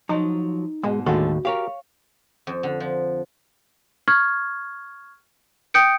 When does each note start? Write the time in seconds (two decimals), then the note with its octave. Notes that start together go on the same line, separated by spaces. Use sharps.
0.09 F3 F#3 D#4
0.83 G#2 B2 G#3
1.06 D#2 A2 D3 G#3 F#4 A4
1.45 G4 A#4 C#5 F5
2.47 F2
2.63 D3
2.80 F3
4.08 C#6 F6 G#6
5.74 G5 D#6 G6 C#7 D7